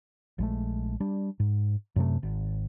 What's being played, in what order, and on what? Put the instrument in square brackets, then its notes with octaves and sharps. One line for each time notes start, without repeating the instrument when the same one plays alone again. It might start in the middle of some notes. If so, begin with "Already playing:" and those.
[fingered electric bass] A#1 G#3 A3
G3 D4
G#2
F#2 C3 A3
G#1